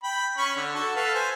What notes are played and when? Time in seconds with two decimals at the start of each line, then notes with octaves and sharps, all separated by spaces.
0.04 G5 B5
0.37 C#4 B5 C#6
0.56 D3
0.75 F#4 A4
0.96 A4 B4 F5
1.15 C5 G#5